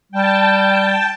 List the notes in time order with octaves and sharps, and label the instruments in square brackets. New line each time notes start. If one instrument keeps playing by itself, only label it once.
[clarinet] G3 [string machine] G5 A5